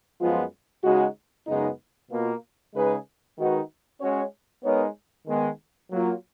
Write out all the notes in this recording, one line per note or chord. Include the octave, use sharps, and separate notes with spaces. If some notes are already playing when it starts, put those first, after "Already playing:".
F#2 F3 G#3 B3 F4
C#3 G#3 D#4 F#4
F#2 C#3 G#3 B3 D#4
B2 A#3 F4
C#3 G#3 D#4 G#4 B4
D#3 G#3 D#4 F#4 B4
G#3 C#4 F#4 C#5
G#3 B3 D#4 A#4 C#5
D#3 G#3 B3
F#3 A#3 F4